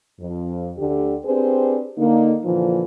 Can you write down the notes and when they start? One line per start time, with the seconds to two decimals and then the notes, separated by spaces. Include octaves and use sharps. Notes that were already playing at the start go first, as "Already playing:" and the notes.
0.21 F2
0.78 D2 D3 G4
1.26 C4 D4 G4 G#4 B4 C5
1.98 D3 A#3 D#4
2.44 A#2 D3 E3 F3